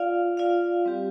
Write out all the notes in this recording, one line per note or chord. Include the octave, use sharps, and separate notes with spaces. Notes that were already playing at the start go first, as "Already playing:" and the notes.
Already playing: F4 D5 F5
F4 D5 F5
G3 C4 G4